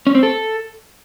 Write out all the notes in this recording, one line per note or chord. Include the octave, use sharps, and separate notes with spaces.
C#4
C4
A4